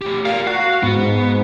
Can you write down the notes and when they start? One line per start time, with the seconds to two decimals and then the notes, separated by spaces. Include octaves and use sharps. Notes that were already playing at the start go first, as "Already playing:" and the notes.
0.02 A3 G4
0.25 A#4 D5 F5
0.47 F#4 F5
0.83 G#2 B3